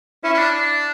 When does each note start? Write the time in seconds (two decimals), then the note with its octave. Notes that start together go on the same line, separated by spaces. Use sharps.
0.24 C#4 E4
0.34 C#4
0.39 D4
0.54 D4